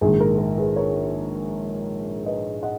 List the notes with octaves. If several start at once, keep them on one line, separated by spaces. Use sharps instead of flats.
A#1 G#2 D#3 G#3 G#4
A#4
A#4
G#4 B4
A#4 C#5
B4 D#5
D#5 F#5